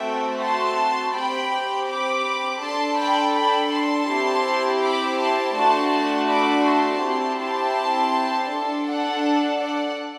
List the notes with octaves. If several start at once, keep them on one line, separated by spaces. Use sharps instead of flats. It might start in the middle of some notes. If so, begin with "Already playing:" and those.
Already playing: A3 C4 F#4 E5 G5
A5 C6
C4 G4 G5 B5
B5 D6
D4 A4 A5 C6
G5 B5
G5 B5
A5 C6
C4 E4 G4
B5 D6
A5 C6
A3 D4 F#4 A5 C6
B5 D6
A5 C6
C4 E4 G4
A5 C6
D4 A4
F#5 A5
D5 F#5